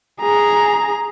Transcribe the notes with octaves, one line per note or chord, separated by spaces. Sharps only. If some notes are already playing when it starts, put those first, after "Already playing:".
G#4 A#5